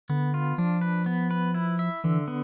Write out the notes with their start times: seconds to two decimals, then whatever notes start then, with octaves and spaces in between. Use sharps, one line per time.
0.09 D3 B3
0.34 F4
0.58 F3 D4
0.81 B4
1.06 B3
1.31 B4
1.54 E4
1.79 E5
2.04 D3 E3
2.28 B3